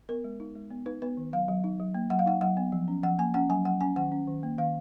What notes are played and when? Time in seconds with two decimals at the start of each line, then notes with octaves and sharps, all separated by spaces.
0.09 B3 A#4
0.24 G#3
0.40 D#4
0.55 G#3
0.71 B3
0.86 D#4 B4
1.02 B3 B4
1.17 D#3
1.33 F#3 F5
1.48 F#3
1.64 D#4
1.80 F#3
1.95 A#3
2.10 F#3 F#5
2.19 F5
2.26 D#4 F#5
2.41 F#3 F#5
2.57 B3
2.72 F3
2.88 C#4
3.03 F3 F#5
3.19 A#3 G#5
3.34 C#4 F#5
3.50 F#3 G#5
3.65 F#3 F#5
3.81 C#4 G#5
3.96 D#3 F#5
4.12 C#4
4.27 D#3
4.43 A#3
4.58 D#3 F5